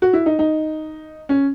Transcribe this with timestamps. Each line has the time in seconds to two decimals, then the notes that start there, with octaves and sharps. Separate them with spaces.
0.02 F#4
0.13 E4
0.26 D#4
0.39 D#4
1.29 C#4